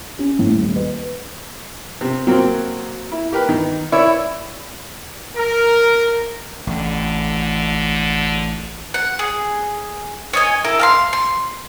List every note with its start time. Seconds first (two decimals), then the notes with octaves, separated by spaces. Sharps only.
0.19 C#4
0.39 A2
0.52 D#1
0.76 B4
2.01 C3
2.27 F#3 A#3 C4
3.12 E4
3.32 G4 A#4 B4
3.49 D#3
3.92 E4 C#5 D5
5.36 A#4
6.67 A1 D3
8.94 F#5
9.19 G#4
10.33 C#5 D#5 G#5
10.64 E4 A4 A#4
10.80 F5 A5 C6
11.13 C6